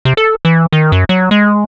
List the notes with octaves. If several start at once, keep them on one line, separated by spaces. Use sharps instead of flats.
C3
A4
E3
D#3
F#2
F#3
G#3